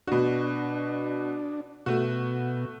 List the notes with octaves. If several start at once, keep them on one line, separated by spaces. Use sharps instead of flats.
B2 D4 F#4
B2 A3 F#4